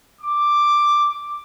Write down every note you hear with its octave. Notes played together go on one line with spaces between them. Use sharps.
D6